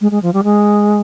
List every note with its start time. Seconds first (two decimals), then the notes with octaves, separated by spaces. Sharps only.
0.01 G#3
0.11 G#3
0.22 F3
0.34 G3
0.44 G#3